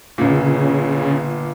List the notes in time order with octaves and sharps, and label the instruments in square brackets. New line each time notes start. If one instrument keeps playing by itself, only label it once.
[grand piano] G1 A#2 [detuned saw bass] C#3